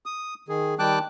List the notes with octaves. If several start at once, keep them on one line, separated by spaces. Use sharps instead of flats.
D#6
D#3 G#4
D#3 G3 G5 A5 D6 F#6